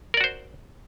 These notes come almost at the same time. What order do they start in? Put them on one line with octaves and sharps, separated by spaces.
A#4 D5 F#4 C5